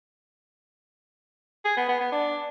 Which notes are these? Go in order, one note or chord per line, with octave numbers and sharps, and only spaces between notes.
G#4
B3
B3
B3
D4